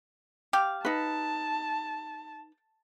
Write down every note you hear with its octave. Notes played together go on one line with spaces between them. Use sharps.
G4 F5
D#4 B4 A5